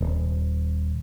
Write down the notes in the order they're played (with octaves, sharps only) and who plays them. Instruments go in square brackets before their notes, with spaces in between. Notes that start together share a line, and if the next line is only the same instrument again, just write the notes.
[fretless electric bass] D#1